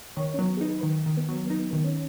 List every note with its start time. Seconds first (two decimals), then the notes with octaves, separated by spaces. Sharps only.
0.17 D#3 C#5
0.34 C#4
0.39 F#3 B3
0.57 G#4
0.61 D#4 B4
0.83 D#3
1.06 D#3
1.17 B3
1.29 F#3
1.50 B3 D#4
1.73 D#3 B3
1.84 C#4